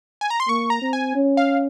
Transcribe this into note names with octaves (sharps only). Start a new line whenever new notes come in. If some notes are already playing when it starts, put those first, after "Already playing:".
G#5
A#5
C6
A#3 C#6
A#5
C4
G#5
C#4
F5